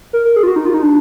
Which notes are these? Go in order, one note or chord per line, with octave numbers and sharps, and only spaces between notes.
A#4
A#4
G#4
F4
F#4
D#4
F4
D#4
D4